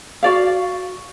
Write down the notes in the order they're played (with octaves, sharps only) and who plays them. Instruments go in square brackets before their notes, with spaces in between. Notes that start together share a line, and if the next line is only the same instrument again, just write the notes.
[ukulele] F#4 D5 F5